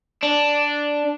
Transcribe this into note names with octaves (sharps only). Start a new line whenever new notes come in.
D4